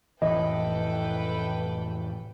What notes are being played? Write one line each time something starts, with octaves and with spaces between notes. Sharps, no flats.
F1 A2 E3 A4 B4 D#5 G5